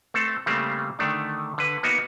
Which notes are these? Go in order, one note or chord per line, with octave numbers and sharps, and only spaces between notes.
A3 C4 A4
C#3 G3 A3 A#3 C4
D3 D#3 A3 D4
D3 B4
A#3 B3 D#4 F#4